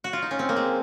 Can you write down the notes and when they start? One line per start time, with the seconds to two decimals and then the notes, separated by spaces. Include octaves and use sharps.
0.04 F#4
0.13 F4
0.22 D#4
0.31 C#4
0.39 C4
0.49 A#3
0.56 G#3